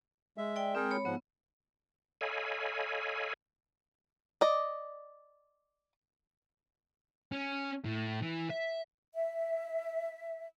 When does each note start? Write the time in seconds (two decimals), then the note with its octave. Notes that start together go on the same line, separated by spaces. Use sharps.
0.37 G#3 E5
0.56 D5 G5
0.75 G#3 C4 G#4 A#4 G5
0.91 C#5 B5
1.05 G#2 F3 B3 F#5
2.21 A4 C#5 D#5 F5 G#5 B5
4.41 D5 D#5
7.32 C#4
7.85 A2
8.22 E3
8.50 E5
9.14 E5